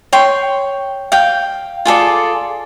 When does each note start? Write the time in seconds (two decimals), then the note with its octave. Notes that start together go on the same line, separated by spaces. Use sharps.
0.13 C#5 G5 C6
1.12 F5 G5
1.85 F4 G#4 A4 D5